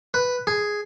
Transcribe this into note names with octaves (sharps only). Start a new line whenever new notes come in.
B4
G#4